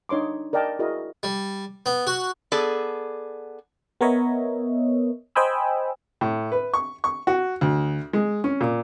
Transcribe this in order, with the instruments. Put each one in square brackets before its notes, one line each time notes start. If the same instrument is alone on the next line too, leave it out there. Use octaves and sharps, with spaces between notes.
[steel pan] D4 D#4 C#5 C6 D6
A#4 D5 D#5 G5 A5
E4 F#4 G#4 A#4 D#5
[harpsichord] G3
B3
F#4
[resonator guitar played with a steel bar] B3 G#4 A4 D5
[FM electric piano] B3 A#4 C#5 D#5 E5
C5 D#5 G5 G#5 B5 E6
[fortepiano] A2
B4
C#6
C#6
F#4
D2
G#3
C#4
A#2